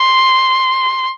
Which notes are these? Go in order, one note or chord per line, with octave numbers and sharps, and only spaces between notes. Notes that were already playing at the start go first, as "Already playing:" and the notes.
Already playing: C6